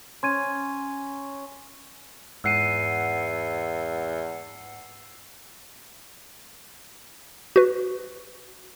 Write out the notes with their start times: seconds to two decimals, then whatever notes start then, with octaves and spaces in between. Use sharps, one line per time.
0.23 C#4 C6 G#6 D#7
2.44 E2 G#2 F#5 E6 C7 C#7 D#7
7.56 F#4 B4